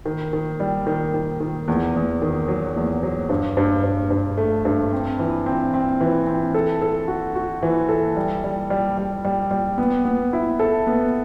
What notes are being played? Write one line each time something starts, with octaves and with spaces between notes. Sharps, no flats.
D#3
D#3
G3
D#3
D#3
D#3
E2
E2
D#3
F#3
E2
F#3
G2
G2
G2
G2
A3
G2
C4
E3
C4
C4
E3
C4
A4
A4
F#4
F#4
E3
A4
G3
G3
G3
G3
G3
G3
B3
B3
E4
A4
B3